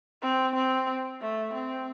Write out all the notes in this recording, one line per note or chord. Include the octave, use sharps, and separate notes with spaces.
C4
C4
A3
C4